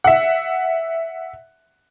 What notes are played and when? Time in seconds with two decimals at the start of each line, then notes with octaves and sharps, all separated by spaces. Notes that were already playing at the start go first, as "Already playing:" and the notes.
0.04 E5 F#5